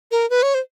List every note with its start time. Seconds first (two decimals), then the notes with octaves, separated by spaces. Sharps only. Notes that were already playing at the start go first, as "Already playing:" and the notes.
0.11 A#4
0.30 B4
0.43 C#5
0.55 C5